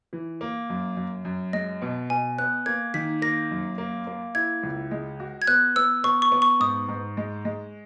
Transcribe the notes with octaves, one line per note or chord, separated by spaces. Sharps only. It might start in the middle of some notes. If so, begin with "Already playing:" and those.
E3
A#3
F#2
F#2
F#2
G#3 D#5
B2
B2 G#5
B3 F#6
A#3 G#6
D#3 B6
A#3 A#6
F#2
A#3
A#3
E4 G#6
C#2
G#3
F#4
G#6
B3 F#6
B3 E6
B3 C#6
C#6
B3
C#6
G#2 D#6
G#2
G#3
G#3